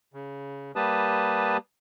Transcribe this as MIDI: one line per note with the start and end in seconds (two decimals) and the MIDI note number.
0.14 0.72 49
0.76 1.57 55
0.76 1.57 58
0.76 1.57 67
0.76 1.57 71
0.76 1.57 81
0.76 1.57 87